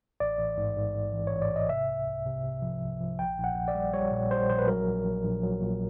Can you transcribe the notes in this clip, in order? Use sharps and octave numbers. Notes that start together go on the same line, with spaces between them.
A1 D5
A1
G#2
G#2
G#2
E3
A1 C#5
D5
G#2 D#5
C3 E5
C2
C2
C3
C3
F3
C2
F3
A#1 G5
A#1
F#5
A#1
D5
G3
G3 C#5
A#2
G3 C5
A#1 C5
B4
F#3 A#4
A#1
A#1
A#1
F#3
A#2